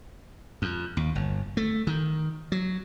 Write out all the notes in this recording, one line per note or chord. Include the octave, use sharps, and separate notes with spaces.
F2
D#2
G1
A3
D#3
F#3